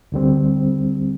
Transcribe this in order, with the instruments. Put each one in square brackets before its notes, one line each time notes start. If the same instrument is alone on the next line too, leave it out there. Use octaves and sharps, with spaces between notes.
[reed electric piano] D2 D3 G3 C4